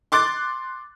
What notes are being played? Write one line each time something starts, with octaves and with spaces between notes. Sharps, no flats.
C6 D6 F#6 A6